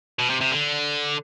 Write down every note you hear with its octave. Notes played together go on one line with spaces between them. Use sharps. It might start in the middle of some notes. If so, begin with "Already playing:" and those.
B2
C3
C3
D3